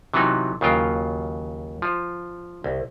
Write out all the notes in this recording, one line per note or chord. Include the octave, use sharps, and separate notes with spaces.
C3 E3 F#3 B3 D#4
D#2 C#3 F#3 F4 G5
F3
C2